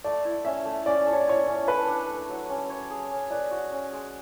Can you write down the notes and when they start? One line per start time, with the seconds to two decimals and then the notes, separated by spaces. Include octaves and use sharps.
0.04 A3 D5
0.25 E4
0.45 C#4 E5
0.65 A3
0.86 C#4 D5
1.06 A4
1.13 C#5
1.20 D5
1.27 E4 C#5
1.47 C#4
1.68 A4 B4
1.88 D4
2.08 A3
2.29 F#3
2.49 C#4
2.70 C#5
2.90 G#4
3.11 C#4
3.31 B4 D5
3.51 F#4
3.72 C#4
3.93 G#3